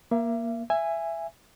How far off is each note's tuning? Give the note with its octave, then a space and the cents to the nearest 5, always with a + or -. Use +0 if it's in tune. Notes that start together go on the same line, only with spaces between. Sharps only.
A#3 +15 E5 +40
E5 +15 G#5 -10